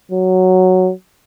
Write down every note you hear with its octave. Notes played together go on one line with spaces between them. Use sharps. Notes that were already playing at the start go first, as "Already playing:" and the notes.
F#3